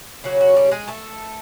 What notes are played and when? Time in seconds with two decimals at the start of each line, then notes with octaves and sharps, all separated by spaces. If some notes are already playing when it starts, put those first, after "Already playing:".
0.24 C#3 F#3 A#3 C#4 F#4
0.41 F#4
0.56 G3 G4
0.71 G#3 G#4
0.88 A3 A4